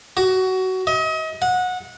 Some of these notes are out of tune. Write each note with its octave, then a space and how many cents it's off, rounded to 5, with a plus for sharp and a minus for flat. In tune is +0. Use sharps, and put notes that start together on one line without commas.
F#4 +20
D#5 +35
F#5 -20